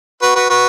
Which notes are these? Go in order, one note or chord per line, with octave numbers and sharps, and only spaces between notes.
F#4 B4
F#4 B4
F#4 B4